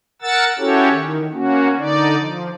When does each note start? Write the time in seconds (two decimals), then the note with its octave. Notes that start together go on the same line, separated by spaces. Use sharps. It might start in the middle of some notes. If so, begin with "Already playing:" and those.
0.22 A#4 F#5 E6 A6
0.58 C#4 E4 F#4 G4 A4 C#5
0.90 D#3
1.33 A#3 C#4 F#4
1.78 D3 D#4 D5
2.18 F3